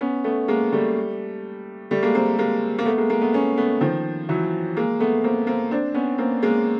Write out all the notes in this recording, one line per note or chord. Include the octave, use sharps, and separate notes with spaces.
B3 C#4
A3 B3
G#3 A#3
G3 A3
G3 A3
G#3 A#3
A#3 C4
G#3 A#3
A#3
A3 B3
G#3 A#3
G#3 A#3
A3 B3
B3 C#4
A3 B3
D#3 F3
E3 F#3
G#3 A#3
A3 B3
A#3 C4
A#3 C4
C4 D4
B3 C#4
A#3 C4
G#3 A#3